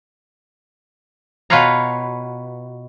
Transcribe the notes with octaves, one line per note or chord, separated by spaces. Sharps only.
B2 F4 B4 C#5 F5 A#5